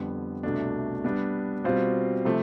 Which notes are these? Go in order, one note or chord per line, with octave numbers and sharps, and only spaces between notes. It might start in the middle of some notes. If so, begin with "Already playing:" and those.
Already playing: F2 D3 G3 B3
C2 B2 A3 D4
G3 B3 D4
B2 G3 C4 F4 C5
C3 F3 A3